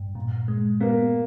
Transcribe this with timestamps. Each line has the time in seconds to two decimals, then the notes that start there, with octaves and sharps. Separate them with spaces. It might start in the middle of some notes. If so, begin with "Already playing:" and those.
Already playing: G2
0.15 A#2
0.48 G#3
0.80 A#3 B3